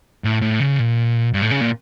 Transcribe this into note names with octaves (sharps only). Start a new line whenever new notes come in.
A2
A2
C#3
A#2
G2
A2
C#3
A#2